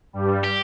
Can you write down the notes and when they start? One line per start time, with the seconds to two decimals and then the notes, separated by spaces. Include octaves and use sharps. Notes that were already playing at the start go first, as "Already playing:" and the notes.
0.13 G2 G3
0.44 G4